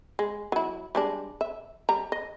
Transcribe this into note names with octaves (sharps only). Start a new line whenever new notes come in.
G#3
F#3 E4
G3 G#3 D4
E5
G3 A#5
D#5